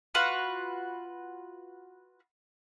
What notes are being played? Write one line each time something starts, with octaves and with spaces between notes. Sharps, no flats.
F4 F#4 B4 C#6